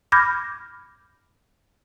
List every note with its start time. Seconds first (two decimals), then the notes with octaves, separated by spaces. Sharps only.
0.12 B5 D6 F6 G6 G#6 A#6